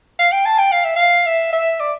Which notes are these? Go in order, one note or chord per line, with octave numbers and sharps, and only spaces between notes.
F5
G5
A5
G5
F5
E5
F5
E5
E5
D5